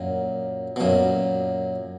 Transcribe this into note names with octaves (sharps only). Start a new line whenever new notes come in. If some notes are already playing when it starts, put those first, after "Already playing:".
Already playing: F#2 A#2
B2
F#2 A#2